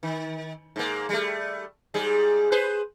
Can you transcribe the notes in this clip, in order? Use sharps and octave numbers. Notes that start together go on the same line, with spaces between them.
D#3
G#2 A#3
G3 A3
G#2 G3 G#4
G#4 B4 C5